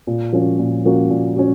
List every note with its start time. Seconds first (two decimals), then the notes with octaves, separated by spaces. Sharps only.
0.07 A#2
0.33 F3 A#3 C#4 F#4
0.59 A#2
0.85 F3 A#3 C#4 F#4
1.10 A#2
1.36 C#4 F#4